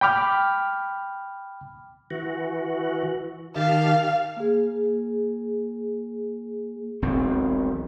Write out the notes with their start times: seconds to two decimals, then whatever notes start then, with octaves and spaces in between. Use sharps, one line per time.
0.01 G5 B5 D6 F6
2.11 E3 F#4
3.56 D#3 G4 F5 A5
4.37 A#3 G#4
7.02 E1 B1 C4